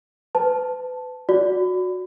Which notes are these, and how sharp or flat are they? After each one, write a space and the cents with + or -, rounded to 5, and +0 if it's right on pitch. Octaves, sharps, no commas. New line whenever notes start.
B4 +35 A5 +0
F#4 -15 D5 -20